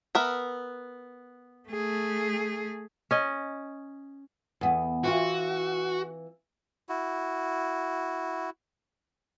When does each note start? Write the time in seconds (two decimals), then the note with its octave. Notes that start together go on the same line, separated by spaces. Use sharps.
0.15 B3 A#4 E5
1.69 A3 G#4
3.11 C#4 D#5
4.61 E2 B3
5.04 E3 C4 F4 F#4
6.89 E4 F#4